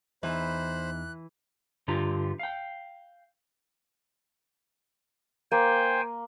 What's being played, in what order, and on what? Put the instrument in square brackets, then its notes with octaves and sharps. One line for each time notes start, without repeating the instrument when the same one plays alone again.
[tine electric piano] E2 D#4 [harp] E3 [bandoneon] C5 B5 [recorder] F#6
[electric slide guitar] G2 D3 F4 G4 A#5
F5 G5
[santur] A#3 [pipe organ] C5 G5 G#5